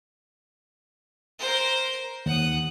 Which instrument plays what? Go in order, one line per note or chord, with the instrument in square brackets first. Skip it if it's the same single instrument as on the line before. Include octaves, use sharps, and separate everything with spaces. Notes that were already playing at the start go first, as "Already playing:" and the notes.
[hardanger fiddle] A#4 C5
[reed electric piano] D#2 [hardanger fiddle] F#5 D#6